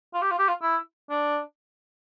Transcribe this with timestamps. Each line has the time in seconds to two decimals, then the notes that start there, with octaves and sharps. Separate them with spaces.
0.14 F4
0.22 G4
0.31 F4
0.39 G4
0.48 F4
0.62 E4
1.10 D4